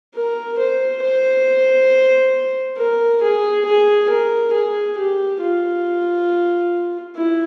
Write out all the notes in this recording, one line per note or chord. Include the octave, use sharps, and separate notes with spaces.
A#4
C5
C5
A#4
G#4
G#4
A#4
G#4
G4
F4
E4